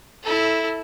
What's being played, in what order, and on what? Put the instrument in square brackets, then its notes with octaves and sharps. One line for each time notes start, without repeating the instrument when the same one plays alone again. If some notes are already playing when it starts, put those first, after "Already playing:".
[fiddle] E4 A4